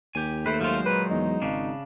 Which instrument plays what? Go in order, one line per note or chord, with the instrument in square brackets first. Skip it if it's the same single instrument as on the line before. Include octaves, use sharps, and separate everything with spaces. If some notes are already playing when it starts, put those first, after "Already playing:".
[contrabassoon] D#2 [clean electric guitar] G4 G#5
[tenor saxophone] A3 [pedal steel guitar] B4 C5
[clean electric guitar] F3 F4 [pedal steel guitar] F#3 G#3 C5
[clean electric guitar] A#2 D#3 [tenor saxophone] B4
[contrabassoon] E2 [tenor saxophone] D#4
[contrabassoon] G#1 [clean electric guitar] C#3 D4